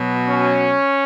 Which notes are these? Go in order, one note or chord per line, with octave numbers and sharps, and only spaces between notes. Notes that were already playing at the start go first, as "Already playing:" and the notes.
Already playing: B2 F#3
C#4